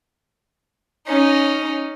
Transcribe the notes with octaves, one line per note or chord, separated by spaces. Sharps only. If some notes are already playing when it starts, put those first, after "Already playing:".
C#4 D#4